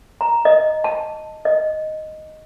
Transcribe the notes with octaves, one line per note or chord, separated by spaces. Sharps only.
A#5
D#5
A5
D#5